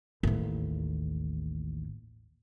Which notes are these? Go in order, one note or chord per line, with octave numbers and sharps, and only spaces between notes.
A1 D#2